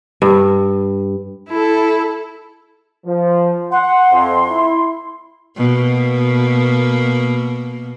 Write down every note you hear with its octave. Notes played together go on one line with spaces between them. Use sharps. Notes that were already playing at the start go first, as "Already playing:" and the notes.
G2
E4 A4
F3
F#5 C6
F2
E4
B2 A#3